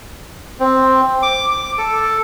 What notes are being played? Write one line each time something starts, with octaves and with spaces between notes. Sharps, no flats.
C4
D6
D6
A4